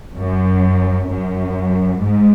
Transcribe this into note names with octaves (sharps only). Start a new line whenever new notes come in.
F#2
F#2
G#2